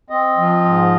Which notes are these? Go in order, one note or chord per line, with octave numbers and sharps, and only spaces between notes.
C4 D#5
F3
G#2